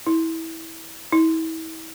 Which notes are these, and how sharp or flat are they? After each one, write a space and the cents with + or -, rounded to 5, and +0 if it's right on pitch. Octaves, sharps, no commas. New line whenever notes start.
E4 -20
E4 -35